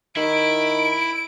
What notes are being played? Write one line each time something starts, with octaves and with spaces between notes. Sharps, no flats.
D#3 E4 D7